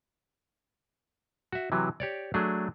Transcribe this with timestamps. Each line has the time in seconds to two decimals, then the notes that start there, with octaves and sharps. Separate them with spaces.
1.52 F#4 E5
1.72 C3 E3 F#3
2.00 G4 C#5 D5
2.34 F#3 A3 D4 G#4